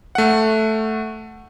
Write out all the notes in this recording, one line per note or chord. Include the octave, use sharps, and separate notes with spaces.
A3 F#5